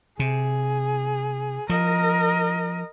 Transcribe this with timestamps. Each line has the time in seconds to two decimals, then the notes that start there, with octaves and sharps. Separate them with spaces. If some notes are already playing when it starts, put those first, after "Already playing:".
0.20 C3 G#4
1.70 F3 A#4 D#5